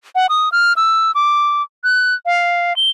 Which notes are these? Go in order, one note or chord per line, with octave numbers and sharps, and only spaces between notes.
F#5
D#6
F6
E6
D6
F#6
F5
G7